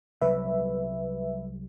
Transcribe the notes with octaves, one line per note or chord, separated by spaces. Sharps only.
C2 F#3 G3 B4 E5